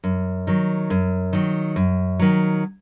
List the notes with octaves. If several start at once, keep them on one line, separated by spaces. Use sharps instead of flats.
F#2
D#3 F#3
F#2
D#3 F#3
F#2
D#3 F#3